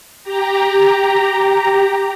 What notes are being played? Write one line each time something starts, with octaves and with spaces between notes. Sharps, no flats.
G4 A#5